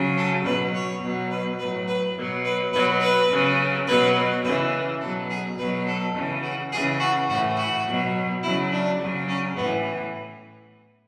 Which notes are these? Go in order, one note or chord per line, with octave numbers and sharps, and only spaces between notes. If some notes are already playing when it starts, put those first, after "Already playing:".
Already playing: C#3 F#3
A4
B2 F#3 B4
C#5
B2 F#3
B4
A2 F#3 B4
B4
B2 F#3
B4
B2 F#3 B4
B4
C#3 F#3
B2 F#3 B4
C#3 E3 B4
B2 F#3 A4
G#4
B2 F#3 B4
A4
C#3 E3
F#4
C#3 E3 G#4
F#4
A2 E3 F#4
F#4
B2 F#3
C#3 F#3 E4
D4
C#3 F#3
C#4
A2 E3 B3